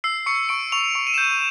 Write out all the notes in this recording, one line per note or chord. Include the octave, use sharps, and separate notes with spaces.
E6 C7
C#6 C#7
C#6 D7
C#6 F7
C#6
D#7
E7
G6
D#7